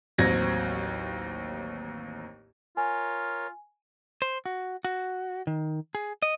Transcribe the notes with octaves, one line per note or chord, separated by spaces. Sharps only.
A1 D#2 F#3 C4 G#6 A#6
F4 A#4 C#5 G#5
C5
F#4
F#4
D#3
G#4
D#5